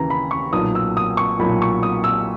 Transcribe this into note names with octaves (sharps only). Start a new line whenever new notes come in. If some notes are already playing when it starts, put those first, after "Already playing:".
Already playing: D#2 C#3 E3 A#5
B5
C#6
B1 A#2 F#3 D#6
E6
D#6
C#6
B1 A#2 F#3 B5
C#6
D#6
E6